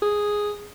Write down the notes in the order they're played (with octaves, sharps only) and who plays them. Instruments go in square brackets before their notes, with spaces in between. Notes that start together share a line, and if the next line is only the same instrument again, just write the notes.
[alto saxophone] G#4